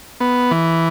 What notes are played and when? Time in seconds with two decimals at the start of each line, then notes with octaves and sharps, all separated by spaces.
0.21 B3
0.51 E3